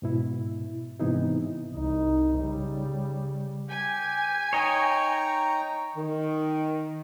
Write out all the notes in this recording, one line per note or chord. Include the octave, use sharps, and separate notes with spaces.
G#2 B2 E4
G#2 C3 E3 B3 D#4 E4
C2 D#4
C#3 G3
G4 G#5
D#4 C#5 D#5 G5 A#5 C#6
D#3